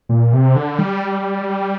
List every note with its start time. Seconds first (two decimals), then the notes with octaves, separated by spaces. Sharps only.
0.09 A#2
0.33 C3
0.56 D3
0.79 G3